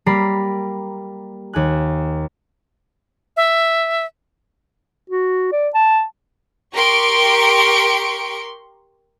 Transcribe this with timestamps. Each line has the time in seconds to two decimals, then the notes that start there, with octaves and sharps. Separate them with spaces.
0.06 G3 A#3 A#5 B5 C7
1.53 D#2 G#5 F#6
3.37 E5
5.10 F#4
5.52 D5
5.74 A5
6.73 G4 A#4 C6 C#6 D7